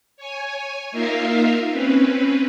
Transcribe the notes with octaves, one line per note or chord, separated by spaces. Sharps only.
C#5 G#5
A#3 D#4 F4 A#4 E5 F5
C4 C#4 B4